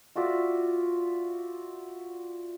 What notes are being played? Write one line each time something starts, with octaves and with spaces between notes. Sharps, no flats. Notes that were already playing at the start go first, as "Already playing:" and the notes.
F4 F#4 D5 E5